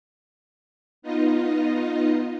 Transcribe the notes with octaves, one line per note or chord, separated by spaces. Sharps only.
B3 D#4 F4 D#5